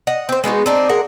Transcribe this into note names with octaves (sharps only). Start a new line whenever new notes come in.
D#5 F#5
C4 C5
G#3 B3 D#4 F#4
C4 D4 D#4
G#3 A#4 F#5